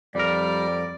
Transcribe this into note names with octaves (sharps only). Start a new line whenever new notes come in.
F2 G3 A#4 D5